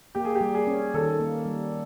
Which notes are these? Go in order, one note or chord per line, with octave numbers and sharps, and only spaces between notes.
A#3 G4
G#4
G4
G3
G#4
C#4
D#3 A4
A#3
G3